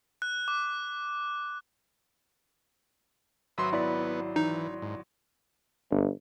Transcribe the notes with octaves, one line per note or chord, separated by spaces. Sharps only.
F#6
D6
G#1 F#3 B4 E5 C6 D#6
B3 E4 D5 B5
E3 D#4
G#2
G1